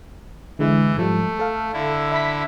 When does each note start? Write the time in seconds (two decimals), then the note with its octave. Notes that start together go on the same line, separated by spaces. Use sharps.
0.59 D3 E3 G#3 E4
0.97 G#2 F3 G3 A3
1.39 A4 F5
1.73 D3 E4
2.12 E5 B5 B6